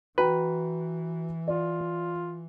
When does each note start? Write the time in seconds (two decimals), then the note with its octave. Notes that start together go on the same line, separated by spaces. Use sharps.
0.18 E3 F#4 B4 G5 A#5
1.48 F4 D5